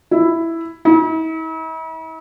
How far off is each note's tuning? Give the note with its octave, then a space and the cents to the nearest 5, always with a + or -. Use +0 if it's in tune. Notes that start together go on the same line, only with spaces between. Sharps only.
E4 +5
E4 -45